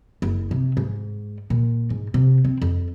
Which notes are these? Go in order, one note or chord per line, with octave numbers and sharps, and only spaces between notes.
F#1
C3
G#2
A#2
G#2
C3
C4
F2